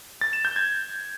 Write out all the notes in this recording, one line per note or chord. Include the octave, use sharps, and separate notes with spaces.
A6
E7
G6
G#6